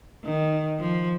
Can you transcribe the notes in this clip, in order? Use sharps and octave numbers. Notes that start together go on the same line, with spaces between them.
D#3
F3